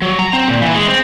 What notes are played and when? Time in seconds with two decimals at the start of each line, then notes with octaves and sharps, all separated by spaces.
0.02 F#3
0.19 A#5
0.33 C4
0.48 A#2
0.62 E3
0.74 G#3
0.88 C4